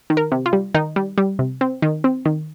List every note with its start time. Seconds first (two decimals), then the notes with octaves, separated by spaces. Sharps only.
0.10 D#3
0.17 A#4
0.32 C3
0.46 F4
0.53 G3
0.75 D#3 D#4
0.96 G3
1.18 G3
1.39 C3
1.61 C4
1.82 D#3
2.04 C4
2.26 D#3